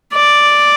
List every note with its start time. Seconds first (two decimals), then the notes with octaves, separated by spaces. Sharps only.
0.14 D5